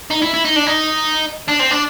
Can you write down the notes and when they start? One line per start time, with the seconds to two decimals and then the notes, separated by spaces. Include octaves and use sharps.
0.10 D#4
0.22 E4
0.34 E4
0.45 D#4
0.56 D4
0.66 D#4
1.49 D4
1.60 C4
1.71 D4